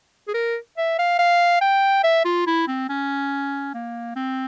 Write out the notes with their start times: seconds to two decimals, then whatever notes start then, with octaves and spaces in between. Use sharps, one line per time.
0.28 G#4
0.34 A#4
0.78 E5
0.99 F5
1.19 F5
1.61 G5
2.04 E5
2.25 F4
2.47 E4
2.68 C4
2.89 C#4
3.74 A#3
4.16 C4